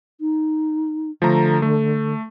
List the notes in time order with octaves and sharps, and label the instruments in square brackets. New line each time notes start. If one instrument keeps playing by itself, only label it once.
[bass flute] D#4
[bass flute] D3 [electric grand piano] F3 A3 A#5
[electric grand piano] A3